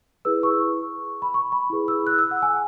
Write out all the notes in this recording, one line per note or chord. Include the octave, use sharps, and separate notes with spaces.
E4 G#4 B4 E6
C#6
B5
C#6
B5
E4 G#4 B4
E6
F#6
E6
F#5
G#5